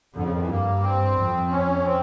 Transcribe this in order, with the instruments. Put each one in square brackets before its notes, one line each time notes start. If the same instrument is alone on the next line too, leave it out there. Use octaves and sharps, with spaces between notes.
[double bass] F2 [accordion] D3
[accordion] C#3
D#3
E3
[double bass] G2 [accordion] A#3
[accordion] C4
[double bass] F2
[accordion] C#4
C4